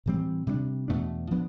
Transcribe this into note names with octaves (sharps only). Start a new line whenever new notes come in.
A2 E3 G3 C4
C3 G3 B3 D4
E2 B2 A3 D4
F3 B3 D4